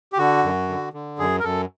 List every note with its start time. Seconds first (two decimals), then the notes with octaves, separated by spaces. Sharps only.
0.13 G4
0.18 D3 F#4
0.43 F#2
0.69 D3
0.93 D3
1.19 F#2 G#4
1.40 A#4
1.43 F#2 A4